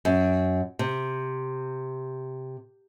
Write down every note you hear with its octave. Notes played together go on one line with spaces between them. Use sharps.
F#2
C3